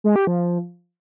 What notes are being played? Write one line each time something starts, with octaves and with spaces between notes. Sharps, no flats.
G#3
G4
F3